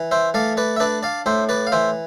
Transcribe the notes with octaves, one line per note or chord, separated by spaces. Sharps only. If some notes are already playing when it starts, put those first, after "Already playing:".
Already playing: E3
C5 E5
A3 D5 F5
B4 D5
E5
D4 B4 D5
D5 F5
A2 C5 E5
B4 D5
F5
E3 C5 E5